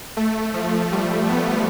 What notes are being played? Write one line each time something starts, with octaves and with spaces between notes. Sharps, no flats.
A3
F3
G3
B3